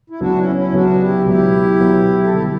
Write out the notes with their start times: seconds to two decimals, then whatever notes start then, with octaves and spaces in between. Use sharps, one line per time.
0.10 E4
0.20 C#2 C#3 F#3 B3 D4 F#4
0.38 C#4 E4
0.55 C#4 E4
0.73 C#2 C#3 F#3 B3 D4 F#4
1.00 E4 G4
1.27 C#2 B2 F#3 B3 E4 G4
1.80 C#2 B2 F#3 B3
2.24 A4
2.33 D3 G3 B3 E4 G4